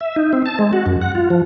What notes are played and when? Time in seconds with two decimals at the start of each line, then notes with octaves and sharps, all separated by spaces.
0.01 E5
0.16 D#4
0.33 C4
0.46 A5
0.59 G#3
0.73 F#4
0.86 F#2
1.02 F#5
1.15 F4
1.30 F3